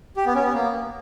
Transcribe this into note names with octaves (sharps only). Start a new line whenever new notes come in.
G4
B3
C#4
B3
A#3